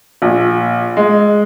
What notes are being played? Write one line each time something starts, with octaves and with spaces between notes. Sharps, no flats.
A#1
G#3